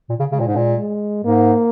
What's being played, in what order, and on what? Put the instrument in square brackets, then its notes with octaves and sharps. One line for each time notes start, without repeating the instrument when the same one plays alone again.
[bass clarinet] A#2
C#3
[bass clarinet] C#3 [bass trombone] G#3
[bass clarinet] A#2
G#2
A#2
[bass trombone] G#3
[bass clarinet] G#2 [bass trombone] A#3